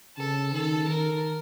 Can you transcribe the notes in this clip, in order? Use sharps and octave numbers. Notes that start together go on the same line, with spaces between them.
C#3 A4
D#3 A4
D#3 A#4